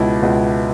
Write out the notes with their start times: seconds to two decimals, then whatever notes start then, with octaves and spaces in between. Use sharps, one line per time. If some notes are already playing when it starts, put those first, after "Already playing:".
Already playing: C#2 B2 E4
0.22 C#2 B2